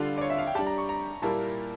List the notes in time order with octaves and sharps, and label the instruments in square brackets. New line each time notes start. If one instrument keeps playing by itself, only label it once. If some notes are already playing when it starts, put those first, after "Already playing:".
Already playing: [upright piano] D3 G3 D4 F4 A4
[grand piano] D5
C#5
E5
F5
G5
[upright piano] G3 D4 G4 [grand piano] A5
[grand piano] A#5
C#6
A#5
[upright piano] A#2 G3 A#3 E4 A#4 [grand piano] A5